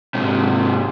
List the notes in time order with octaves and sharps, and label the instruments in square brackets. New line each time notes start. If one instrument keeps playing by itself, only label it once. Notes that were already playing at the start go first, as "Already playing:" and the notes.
[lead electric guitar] G#2 C3